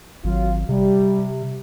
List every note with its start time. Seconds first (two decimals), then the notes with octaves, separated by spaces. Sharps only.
0.24 G#1 F#3 F4
0.69 C3 G3